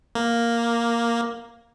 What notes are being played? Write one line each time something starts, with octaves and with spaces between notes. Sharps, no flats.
A#3